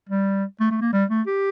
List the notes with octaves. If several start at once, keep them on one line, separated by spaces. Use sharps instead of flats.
G3
A3
A3
A#3
G3
A3
G4